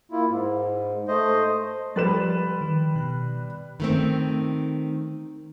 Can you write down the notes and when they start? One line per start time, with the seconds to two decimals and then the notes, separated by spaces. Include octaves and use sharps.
0.11 A#3 E4 F4
0.29 G#2
1.08 A3 C5 D#5
1.96 F3 G3 B4 C6 A6 E7
2.61 D#3
2.95 B2 F#6
3.80 D#3 A3 C4